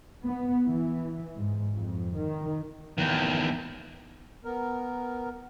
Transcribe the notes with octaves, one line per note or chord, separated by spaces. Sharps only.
B3
E3
G#2
F2
D#3
E2 D#3
B3 A#4